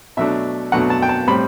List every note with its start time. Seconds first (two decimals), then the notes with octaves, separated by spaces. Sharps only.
0.17 B2 F#3 A3 D4 E5
0.72 B2 F#3 A3 D4 F#5
0.90 A5
1.02 G5
1.09 A5
1.28 A2 G3 C4 B5